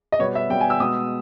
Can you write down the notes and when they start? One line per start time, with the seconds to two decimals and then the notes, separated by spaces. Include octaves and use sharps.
0.12 D#5
0.19 B2 G3 B3 C#5
0.35 E5
0.49 B2 G3 B3 G5
0.61 G#5
0.70 E6
0.80 B2 G#3 B3 D#6